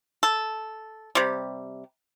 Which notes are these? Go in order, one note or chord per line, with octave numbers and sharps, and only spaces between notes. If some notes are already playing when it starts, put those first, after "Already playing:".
A4
C3 G3